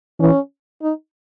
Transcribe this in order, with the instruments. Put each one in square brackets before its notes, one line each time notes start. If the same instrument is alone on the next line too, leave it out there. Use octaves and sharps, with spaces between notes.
[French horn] E3 [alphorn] C#4
[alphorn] D#4